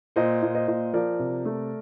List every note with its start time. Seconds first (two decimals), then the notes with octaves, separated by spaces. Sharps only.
0.16 A#2 C5 D#5
0.42 A#2
0.55 C5 D#5
0.68 A#2
0.93 F3 A#4 D5
1.19 C3
1.45 A3